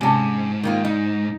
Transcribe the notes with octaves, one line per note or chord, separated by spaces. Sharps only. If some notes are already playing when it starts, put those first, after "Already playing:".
G#2 C3 C#4 G#5 A5
D#3 A#3 F4
D#4